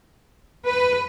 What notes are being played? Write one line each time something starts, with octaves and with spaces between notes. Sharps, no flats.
B4